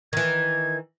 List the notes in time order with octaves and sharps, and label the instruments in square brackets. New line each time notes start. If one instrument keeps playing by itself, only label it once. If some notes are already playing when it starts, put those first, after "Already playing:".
[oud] D#3 E3 [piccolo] G#6